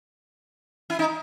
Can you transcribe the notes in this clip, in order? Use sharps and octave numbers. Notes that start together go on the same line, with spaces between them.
E4
D#4